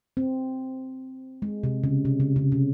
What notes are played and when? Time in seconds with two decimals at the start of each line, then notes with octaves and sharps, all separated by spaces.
0.17 C4
1.42 G#3
1.64 C3
1.84 C#3
2.05 C3
2.20 C#3
2.36 C#3
2.52 C3